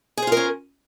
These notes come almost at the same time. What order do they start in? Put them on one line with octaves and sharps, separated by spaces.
G#4 C5 F4 A#4 C#4